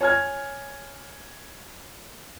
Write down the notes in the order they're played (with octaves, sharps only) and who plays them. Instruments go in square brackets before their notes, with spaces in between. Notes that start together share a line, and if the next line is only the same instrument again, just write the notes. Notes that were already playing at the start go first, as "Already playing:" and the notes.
[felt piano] C#5 G#5 F6 G#6